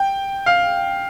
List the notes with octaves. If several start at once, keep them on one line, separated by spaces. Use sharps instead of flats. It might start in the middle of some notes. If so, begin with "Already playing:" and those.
Already playing: G5
F5